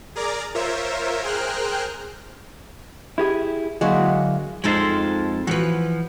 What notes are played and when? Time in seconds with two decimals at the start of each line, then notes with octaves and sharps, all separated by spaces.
0.16 G#4 A#4 D5 A#5 D6
0.54 F4 A#4 C5 C#5 E5
1.23 G#4 A#4 C5 G5 F6 F#6
3.18 E4 G4 G#4
3.81 D3 F#3 G#3 A#3 E4 F#4
4.64 F2 F3 G#3 D#4 A4 C5
5.47 E3 F3 F#4 B4